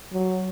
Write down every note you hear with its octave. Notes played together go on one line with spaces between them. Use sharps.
F#3